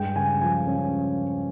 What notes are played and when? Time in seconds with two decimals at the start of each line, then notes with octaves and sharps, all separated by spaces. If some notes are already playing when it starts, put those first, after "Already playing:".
Already playing: G2 G#3 G5
0.16 C#3 G#5
0.41 F3 G#5
0.67 C#4